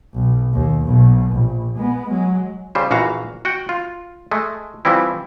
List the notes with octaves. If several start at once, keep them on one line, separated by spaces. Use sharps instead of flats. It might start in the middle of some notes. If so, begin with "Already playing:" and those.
B1
D#2
B1 B2
A#1
G#3 B3
F#3 G#3
C#3 G3 C5
A#1 E3 F#4 F5 A#5
F#4 F#5 G5
F4
G#3 A3
E3 F3 G3 C4 E4